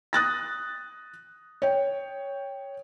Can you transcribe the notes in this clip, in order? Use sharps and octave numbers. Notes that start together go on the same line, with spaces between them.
D#6 F#6 A6 A#6
C#5 G5